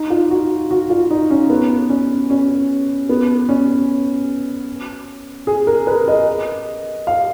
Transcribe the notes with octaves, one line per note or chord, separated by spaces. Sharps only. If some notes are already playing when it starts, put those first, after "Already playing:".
Already playing: D#4
F4
F#4
F#4
F4
D#4
C#4
B3
C#4
C#4
B3
C#4
G#4
A#4
B4
D#5
F5